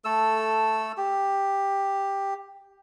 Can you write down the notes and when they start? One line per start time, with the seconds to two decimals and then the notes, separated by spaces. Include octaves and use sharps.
0.05 A3 A4 E6
0.97 G4